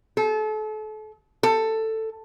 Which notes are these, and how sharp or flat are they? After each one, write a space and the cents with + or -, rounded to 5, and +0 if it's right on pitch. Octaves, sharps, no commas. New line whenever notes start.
A4 -35
A4 +10